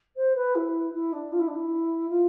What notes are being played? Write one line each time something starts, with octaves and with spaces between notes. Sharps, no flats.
C5
B4
E4
E4
D4
F4
E4
D4
E4
F4